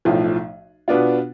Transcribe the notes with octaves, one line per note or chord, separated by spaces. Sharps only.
B1 A2 F3
B2 B3 D4 F4